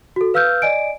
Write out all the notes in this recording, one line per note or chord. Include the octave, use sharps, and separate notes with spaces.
F#4 A4
B4 F5 E6 F6 G6
D5 D#5 G#5 D7